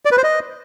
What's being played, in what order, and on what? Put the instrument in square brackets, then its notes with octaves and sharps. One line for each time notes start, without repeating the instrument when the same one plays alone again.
[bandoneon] D5
B4
C5
D#5